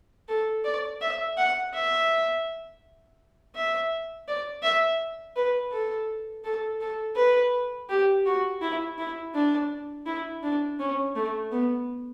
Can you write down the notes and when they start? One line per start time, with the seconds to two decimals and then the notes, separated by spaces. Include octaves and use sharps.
0.29 A4
0.64 D5
1.01 E5
1.37 F#5
1.74 E5
3.55 E5
4.28 D5
4.63 E5
5.36 B4
5.71 A4
6.44 A4
6.81 A4
7.16 B4
7.89 G4
8.26 F#4
8.62 E4
8.98 E4
9.34 D4
10.06 E4
10.43 D4
10.79 C#4
11.15 A3
11.52 B3